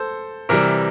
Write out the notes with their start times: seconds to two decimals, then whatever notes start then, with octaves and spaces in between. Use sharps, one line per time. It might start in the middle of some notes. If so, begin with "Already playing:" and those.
Already playing: A4 C5
0.49 C3 E3 G3 A#4